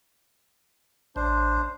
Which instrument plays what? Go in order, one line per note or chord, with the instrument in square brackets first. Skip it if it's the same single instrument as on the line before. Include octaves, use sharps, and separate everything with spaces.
[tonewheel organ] A1 [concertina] D4 C5